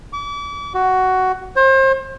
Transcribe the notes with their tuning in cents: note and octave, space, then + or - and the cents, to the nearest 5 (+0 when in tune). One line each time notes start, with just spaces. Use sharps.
D6 -40
F#4 +10
C5 +35